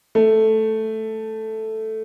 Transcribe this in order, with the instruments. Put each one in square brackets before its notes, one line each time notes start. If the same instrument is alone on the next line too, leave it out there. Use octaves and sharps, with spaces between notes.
[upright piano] A3